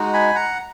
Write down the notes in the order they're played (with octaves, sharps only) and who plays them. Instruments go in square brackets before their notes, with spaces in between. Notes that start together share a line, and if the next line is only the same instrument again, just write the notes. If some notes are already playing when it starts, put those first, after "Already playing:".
Already playing: [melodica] G#3 D#4 F#4
G#5 B5
F#5 A#5